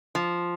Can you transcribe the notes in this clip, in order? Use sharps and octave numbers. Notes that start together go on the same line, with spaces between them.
F3